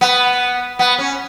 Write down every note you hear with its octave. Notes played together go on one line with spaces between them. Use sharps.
B3
B3
C#4